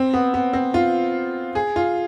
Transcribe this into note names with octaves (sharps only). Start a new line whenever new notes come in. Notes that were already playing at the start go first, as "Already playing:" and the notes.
Already playing: C4
B3
B3
C4
F4
G#4
F4